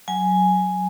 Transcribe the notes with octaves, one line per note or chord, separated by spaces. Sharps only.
F#3 G#5